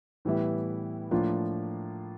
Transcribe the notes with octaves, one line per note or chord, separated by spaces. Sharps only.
A2 E3 G3 B3 E4
A2 F3 A#3 D4 F4